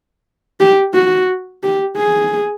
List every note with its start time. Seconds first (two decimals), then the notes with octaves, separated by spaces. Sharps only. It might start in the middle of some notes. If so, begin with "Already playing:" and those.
0.60 G4
0.94 F#4
1.63 G4
1.97 G#4